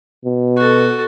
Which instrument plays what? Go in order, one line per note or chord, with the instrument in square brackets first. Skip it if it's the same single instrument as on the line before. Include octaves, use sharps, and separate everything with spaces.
[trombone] B2
[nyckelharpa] F#4 A4